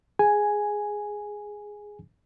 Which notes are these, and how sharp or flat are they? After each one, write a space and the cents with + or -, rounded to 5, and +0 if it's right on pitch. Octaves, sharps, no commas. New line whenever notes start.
G#4 +0 G#5 +0